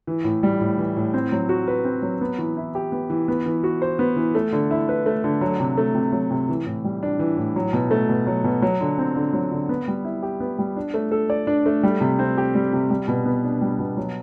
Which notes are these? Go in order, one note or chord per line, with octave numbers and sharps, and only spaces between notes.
E3
A2
G3
A2
E3
A2
C4
F#3
F#4
B4
C4
F#3
B3
E3
E4
G4
B3
E3
B3
E3
F#4
C5
B3
E3
A3
D3
E4
B4
A3
D3
F#3
C3
A3
C3
F#3
C3
E3
A2
G3
D4
E3
A2
F#3
B2
A3
B2
F#3
B2
F#3
D3
C4
D3
F#3
D3
B3
G3
E4
G4
B3
G3
D4
A3
A4
D5
D4
A3
G3
C3
C4
G4
G3
C3
G3
B2
B3
D4
G3
B2
F#3